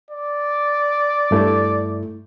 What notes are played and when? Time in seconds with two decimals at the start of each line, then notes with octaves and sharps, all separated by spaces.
0.10 D5
1.31 G2 A3 E4